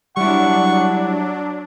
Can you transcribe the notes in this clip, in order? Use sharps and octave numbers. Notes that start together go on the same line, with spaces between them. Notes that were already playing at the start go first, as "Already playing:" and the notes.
F#3 G3 D4 E4 F#5 C#6